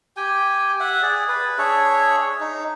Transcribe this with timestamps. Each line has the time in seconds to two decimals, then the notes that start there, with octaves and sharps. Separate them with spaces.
0.17 G4 G5 G#5
0.80 E5 F#5
1.02 G#4 D5
1.29 B4
1.58 D4 G#4 C#5 E5
2.40 D#4